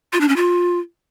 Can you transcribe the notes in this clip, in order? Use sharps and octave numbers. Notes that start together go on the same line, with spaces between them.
F4
D4
C#4
F4